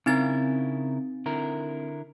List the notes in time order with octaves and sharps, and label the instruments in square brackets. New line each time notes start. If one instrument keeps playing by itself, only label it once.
[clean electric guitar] C#3 E4 A#4 [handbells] C4 D#4 A6
[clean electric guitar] D3 E4 A#4